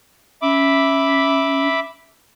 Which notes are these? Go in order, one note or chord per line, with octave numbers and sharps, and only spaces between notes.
C#4 E5 B5 D6